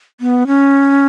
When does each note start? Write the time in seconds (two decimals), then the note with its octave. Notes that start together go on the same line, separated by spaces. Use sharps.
0.20 B3
0.47 C#4